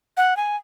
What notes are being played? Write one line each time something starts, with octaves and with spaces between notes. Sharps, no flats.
F#5
G#5